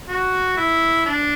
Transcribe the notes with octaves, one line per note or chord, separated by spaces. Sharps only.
F#4
E4
D4